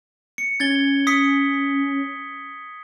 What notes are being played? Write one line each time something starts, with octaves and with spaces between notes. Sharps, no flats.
C#7
C#4 G#6 A6 G7
D#6 B6 C#7